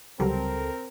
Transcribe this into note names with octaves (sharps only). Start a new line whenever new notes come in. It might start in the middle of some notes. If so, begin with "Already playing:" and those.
C#2 C3 F#3 G3 C4 A4 A#4